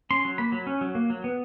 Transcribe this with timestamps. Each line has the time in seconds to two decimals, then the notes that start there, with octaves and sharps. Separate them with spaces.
0.11 C#4 C6
0.25 F#3
0.38 A#3 B5
0.52 F#3
0.67 C#4
0.81 F#3
0.95 A#3
1.10 F#3
1.24 B3